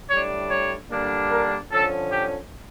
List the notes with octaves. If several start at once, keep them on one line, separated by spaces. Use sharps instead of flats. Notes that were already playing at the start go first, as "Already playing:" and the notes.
A2 G3 D4 C#5
C#5
D3 G3 A#3 D4
A#4
D3 F3 C#4 A4
G4